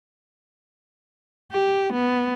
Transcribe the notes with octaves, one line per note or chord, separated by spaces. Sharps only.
G4
B3